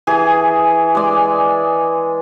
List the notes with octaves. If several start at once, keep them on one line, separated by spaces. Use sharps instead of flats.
E3 G#4
G#3 D5